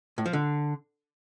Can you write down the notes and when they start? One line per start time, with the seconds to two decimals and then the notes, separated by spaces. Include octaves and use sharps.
0.18 A2
0.26 F3
0.33 D3